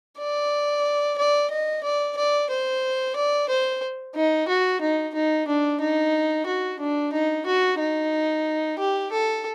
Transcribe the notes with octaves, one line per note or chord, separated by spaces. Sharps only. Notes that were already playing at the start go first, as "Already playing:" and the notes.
D5
D5
D#5
D5
D5
C5
D5
C5
D#4
F#4
D#4
D#4
D4
D#4
F#4
D4
D#4
F#4
D#4
G4
A4